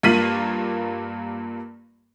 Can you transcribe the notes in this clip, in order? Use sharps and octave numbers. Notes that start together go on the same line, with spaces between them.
G2 A#3 F4 B6 D#7 F#7